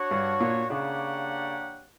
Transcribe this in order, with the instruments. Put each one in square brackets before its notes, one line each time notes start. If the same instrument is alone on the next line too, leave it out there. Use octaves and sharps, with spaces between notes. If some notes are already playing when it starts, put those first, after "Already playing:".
Already playing: [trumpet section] D4 F#4 C#5 F#5
[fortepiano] G2
A#2
[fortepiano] C#3 [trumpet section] A#3 D4 G4 C#5 F#5